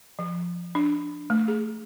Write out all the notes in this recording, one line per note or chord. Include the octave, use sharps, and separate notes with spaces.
F3
D4
A3
G#4